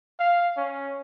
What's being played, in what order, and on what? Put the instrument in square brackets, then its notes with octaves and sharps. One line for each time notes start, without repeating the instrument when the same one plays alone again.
[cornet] F5
C#4